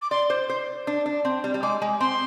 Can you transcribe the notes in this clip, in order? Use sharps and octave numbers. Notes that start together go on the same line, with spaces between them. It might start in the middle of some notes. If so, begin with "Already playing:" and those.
D6
D5 C6
C5
C5
D4
D4
C4
G3
G3
G#3 D6
G#3
C4 C6